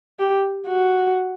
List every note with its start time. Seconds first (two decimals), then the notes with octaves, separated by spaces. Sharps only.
0.19 G4
0.67 F#4